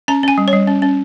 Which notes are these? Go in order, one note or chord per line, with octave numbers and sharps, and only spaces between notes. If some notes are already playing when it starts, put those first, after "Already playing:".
C#4 A#5
C#4 G#5
G3
C#5
G3
C#4
C#4